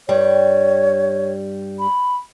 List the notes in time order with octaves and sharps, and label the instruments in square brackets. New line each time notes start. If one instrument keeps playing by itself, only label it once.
[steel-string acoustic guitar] G2 G3 [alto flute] C#5
[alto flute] B5